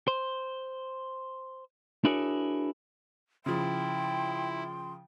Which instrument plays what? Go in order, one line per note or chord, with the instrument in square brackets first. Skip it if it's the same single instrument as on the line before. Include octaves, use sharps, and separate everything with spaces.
[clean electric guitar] C5
D4 E4 F#4 G#4 A#4 C#5
[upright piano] C#3 F3 [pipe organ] E4 [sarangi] G5 [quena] C6